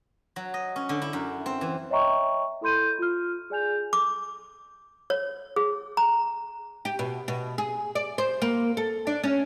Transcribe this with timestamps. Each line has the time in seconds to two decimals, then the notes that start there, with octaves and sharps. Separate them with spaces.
0.36 F#3
0.54 D#5
0.76 C#4
0.89 D3
1.02 E4
1.13 F#2
1.46 C4
1.61 E3
1.90 C#5 D#5 E5 G5 A#5 C#6
2.61 E4 A4 B5 C6 G6 D#7
2.99 F4 F6
3.50 G#4 D5 G#5 G6 F7
3.93 D6
5.10 C#5
5.56 G#4
5.97 A#5
6.85 G4
6.99 B2
7.28 B2
7.58 G#4
7.95 D5
8.18 C5
8.42 A#3
8.77 A4
9.07 D4
9.24 C#4